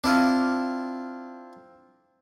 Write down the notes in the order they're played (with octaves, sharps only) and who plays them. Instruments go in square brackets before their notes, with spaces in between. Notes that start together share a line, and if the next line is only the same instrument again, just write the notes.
[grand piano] C4 [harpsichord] D4 E4 F4